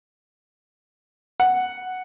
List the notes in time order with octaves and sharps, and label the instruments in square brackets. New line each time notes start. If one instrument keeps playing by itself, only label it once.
[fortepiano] F#5